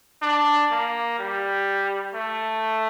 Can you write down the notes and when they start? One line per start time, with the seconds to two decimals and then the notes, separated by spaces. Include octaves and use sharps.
0.22 D4
0.71 A#3
1.19 G3
2.15 A3